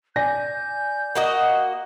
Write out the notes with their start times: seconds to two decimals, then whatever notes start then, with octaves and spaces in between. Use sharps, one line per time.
0.16 D5 G#5 G6 A#6
1.15 A#3 F#4 D#5 F#5